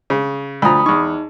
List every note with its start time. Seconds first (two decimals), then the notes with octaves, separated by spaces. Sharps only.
0.10 C#3
0.62 D2 F3 A#5 B5 D#6
0.86 E2 D#4 C#6